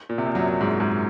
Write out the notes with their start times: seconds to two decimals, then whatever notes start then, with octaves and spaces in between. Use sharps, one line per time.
0.09 A#2
0.18 C3
0.26 A#1 A#2
0.35 F#2 F#3
0.61 G#2 G#3
0.80 G#2 G#3